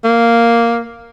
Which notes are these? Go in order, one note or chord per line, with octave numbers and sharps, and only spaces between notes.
A#3